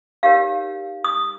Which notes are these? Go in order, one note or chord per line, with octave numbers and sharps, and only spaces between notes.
D#4 G4 A#4 C#5 F5
D#6